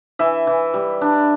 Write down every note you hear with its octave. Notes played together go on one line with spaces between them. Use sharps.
E3 E5
E3
G3
D4